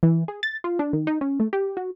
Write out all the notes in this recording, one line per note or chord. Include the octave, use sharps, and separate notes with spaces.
E3
G#4
A6
F4
D4
D#3
D#4
C#4
A3
G4
F#4